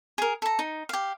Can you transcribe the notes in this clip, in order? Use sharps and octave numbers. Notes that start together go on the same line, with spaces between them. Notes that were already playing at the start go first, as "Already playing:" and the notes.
G#4 A#4
A4 A#5
D#4
G4 F5